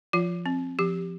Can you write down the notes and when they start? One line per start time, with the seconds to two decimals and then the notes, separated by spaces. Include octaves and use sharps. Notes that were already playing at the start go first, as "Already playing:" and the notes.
0.13 F3 F4
0.46 C4
0.79 F3 G4